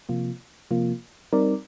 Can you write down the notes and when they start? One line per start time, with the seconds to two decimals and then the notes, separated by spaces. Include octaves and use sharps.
0.09 C3 F3 A#3 F4
0.71 C3 F3 A#3 F4
1.33 G3 C4 D#4 A#4 D5